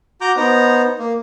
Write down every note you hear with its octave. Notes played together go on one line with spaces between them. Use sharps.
F#4 A#5 D6 G6
B3 D#4 C5 A#5
A#3